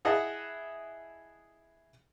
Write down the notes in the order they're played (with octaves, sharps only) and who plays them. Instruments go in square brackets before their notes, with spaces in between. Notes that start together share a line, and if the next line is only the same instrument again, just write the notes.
[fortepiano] E4 G#4 D#5 F#5 A5